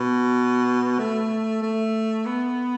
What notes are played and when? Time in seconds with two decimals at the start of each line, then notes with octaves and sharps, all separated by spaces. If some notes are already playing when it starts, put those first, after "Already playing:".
Already playing: B2
0.99 A3
1.62 A3
2.26 B3